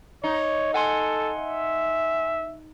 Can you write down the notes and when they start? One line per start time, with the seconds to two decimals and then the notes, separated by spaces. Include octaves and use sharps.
0.24 D#4 C#5
0.74 A4 F#5 G#5 C6
1.39 E5